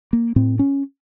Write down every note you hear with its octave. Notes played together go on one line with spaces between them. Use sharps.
A#3
A2 C4
C#4